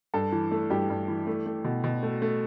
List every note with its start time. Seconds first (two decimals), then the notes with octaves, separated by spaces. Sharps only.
0.14 G2 A4
0.32 E3
0.51 A3
0.70 G2 G4
0.90 G2
1.08 E3
1.27 A3
1.46 A3
1.65 B2
1.84 B2
2.03 A3
2.22 A3